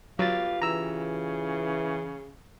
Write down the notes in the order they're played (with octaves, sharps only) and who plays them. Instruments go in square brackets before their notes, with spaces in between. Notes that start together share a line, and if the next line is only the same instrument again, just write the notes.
[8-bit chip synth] F#3 A6 [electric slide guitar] F4 G4 B4 [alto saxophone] F5
[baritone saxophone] C#3 [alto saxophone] E3 [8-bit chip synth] A#5 E6